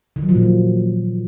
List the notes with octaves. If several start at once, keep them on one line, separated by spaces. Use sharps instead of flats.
D#3
F#3
F3
A#2
F#3